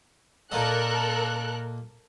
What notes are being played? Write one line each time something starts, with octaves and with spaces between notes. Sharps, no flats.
A#2 A#3 A4 A#4 D#5 F#6